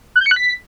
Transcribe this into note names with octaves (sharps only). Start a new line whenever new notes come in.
F#6
G6
C#7
F#6
B6